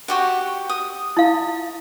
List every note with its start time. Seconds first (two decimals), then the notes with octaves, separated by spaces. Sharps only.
0.08 F#4 G4 F#5
0.69 D#6
1.17 E4 F5